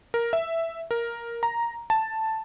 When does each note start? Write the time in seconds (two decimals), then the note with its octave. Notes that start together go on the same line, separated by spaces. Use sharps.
0.14 A#4
0.33 E5
0.91 A#4
1.43 A#5
1.90 A5